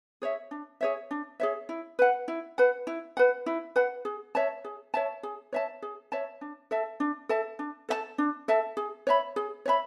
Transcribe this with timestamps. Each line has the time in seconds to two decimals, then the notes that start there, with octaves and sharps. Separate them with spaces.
0.22 G#4 C#5 E5
0.51 D4
0.81 G#4 C#5 E5
1.11 D4
1.40 G#4 C#5 E5
1.69 E4
1.99 B4 F#5
2.28 E4
2.58 B4 F#5
2.87 E4
3.17 B4 F#5
3.46 E4
3.76 B4 F#5
4.05 G#4
4.35 C#5 E5 A5
4.64 G#4
4.94 C#5 E5 A5
5.23 G#4
5.53 C#5 E5 A5
5.82 G#4
6.12 C#5 E5 A5
6.41 D4
6.71 A4 E5 A5
7.00 D4
7.29 A4 E5 A5
7.59 D4
7.89 A4 E5 A5
8.18 D4
8.48 A4 E5 A5
8.77 G#4
9.07 C#5 E5 B5
9.36 G#4
9.65 C#5 E5 B5